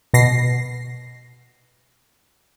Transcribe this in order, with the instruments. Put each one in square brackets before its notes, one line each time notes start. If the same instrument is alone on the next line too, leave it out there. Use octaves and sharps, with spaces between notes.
[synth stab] B2 A#6 C7